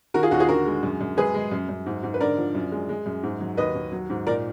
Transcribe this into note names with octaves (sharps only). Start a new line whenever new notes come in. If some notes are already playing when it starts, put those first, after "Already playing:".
D#3 F#4 A#4
F4 G#4
D#2 D#4 F#4
F4 G#4
D3 F#4 A#4
G#3
F#2
F#2
G#3 G#4 B4
G#3
F#2
F#2
G#2
G#2
B4
D3 A#4 D5
F3
F#2
G#3
G#3
F#2
G#2
F#3
D#2 B4 D#5
D#2
F#3
G#2
A#2 A#4 D5